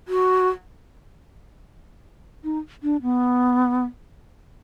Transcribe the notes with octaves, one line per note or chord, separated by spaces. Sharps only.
F#4
D#4
D4
B3